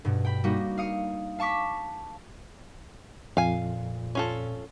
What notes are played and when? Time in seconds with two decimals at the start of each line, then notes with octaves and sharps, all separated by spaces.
0.05 G2 B2
0.25 G5 B5
0.44 G3 A#3 D#4 F#4
0.78 F5 D#6 C#7
1.39 F5 A5 C#6 D6 B6
3.37 F2 A#2 F5 G#5
4.15 C#4 F4 A4